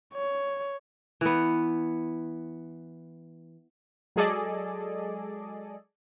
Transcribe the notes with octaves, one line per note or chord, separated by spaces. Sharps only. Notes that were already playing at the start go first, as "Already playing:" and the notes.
C#5
E3 B3
F#3 G#3 G#4 A4 D5 D#5